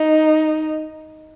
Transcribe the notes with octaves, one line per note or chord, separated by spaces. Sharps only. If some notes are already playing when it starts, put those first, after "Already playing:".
Already playing: D#4